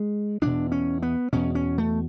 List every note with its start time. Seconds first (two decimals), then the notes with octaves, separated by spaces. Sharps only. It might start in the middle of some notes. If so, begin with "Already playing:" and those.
Already playing: G#3
0.42 E2 B2 D4
0.72 C#4
1.02 B3
1.33 E2 B2 C#4
1.55 C#4
1.78 A3